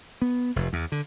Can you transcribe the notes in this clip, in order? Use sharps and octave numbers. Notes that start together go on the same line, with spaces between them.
B3
F1
E2
D3